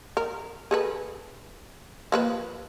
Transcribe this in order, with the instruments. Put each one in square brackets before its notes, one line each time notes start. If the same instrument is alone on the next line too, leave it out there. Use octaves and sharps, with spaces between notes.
[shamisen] A#4
G#4 A4 B4
F3 A#3 B4